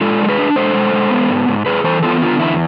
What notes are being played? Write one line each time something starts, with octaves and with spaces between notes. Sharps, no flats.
G#3 F4 A4
D4
A4
G#4 B4
D4
G#3 A4 C5
G#3
G#3
B3
G#2
G#2
G#2 G#4 B4
E3 A4 C5
B3 F4 A4
D3 F4
E2 E4